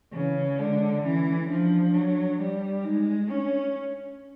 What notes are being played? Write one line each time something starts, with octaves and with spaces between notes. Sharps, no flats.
C#3 E3
D3 G#3
E3 C#4
F3 D4
F#3
G3
G#3 D#4
C#4 D4